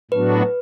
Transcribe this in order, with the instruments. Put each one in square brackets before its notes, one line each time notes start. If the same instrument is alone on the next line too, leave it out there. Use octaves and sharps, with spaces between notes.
[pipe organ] A2 F#3 B3 D4 F#4 [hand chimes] B4